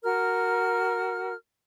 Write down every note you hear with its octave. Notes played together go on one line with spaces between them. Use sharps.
F#4 A#4 F6